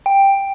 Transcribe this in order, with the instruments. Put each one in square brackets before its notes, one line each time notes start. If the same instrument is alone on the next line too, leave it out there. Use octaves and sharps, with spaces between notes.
[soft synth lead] G5